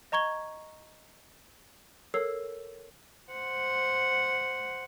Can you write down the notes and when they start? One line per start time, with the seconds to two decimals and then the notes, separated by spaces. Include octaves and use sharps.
0.12 D#5 A#5 C#6 G#6 G7
2.14 A4 A#4 C#5 E6 C7
3.32 C5 F#5